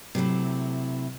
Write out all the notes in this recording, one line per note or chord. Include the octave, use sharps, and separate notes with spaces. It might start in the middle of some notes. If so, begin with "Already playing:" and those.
C3 F#3 A3 E4